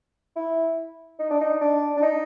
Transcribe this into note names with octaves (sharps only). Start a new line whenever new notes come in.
E4
D#4
D4
D#4
D4
D4
D#4